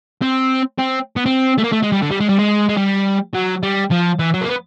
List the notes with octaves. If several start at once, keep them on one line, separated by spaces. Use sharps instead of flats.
C4
C4
B3
C4
A3
A#3
A3
G#3
G3
D3
G3
G#3
G3
G#3
G#3
G3
F#3
G3
F3
E3
F#3
A#3
B3